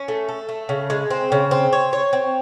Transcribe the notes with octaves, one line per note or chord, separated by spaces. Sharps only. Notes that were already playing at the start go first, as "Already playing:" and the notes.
Already playing: C#4
A3
A4
A3
C#3
G#3
C4
C#3
C4
C#5
C#5
C4